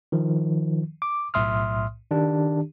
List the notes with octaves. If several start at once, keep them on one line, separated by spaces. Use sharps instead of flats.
D#3 F3
D6
B1 A2 E5 C6 D#6 F6
D#3 D4 G4